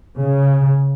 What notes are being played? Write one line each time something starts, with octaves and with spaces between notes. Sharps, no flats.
C#3